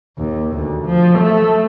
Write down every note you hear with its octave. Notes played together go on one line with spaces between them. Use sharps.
D#2
D2
F3
A3